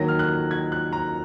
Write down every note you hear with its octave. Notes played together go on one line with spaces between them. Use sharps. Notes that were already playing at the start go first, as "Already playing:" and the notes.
Already playing: D#2 D#3 F#3 A#6
F6
F#6
G#6
F#6
A#5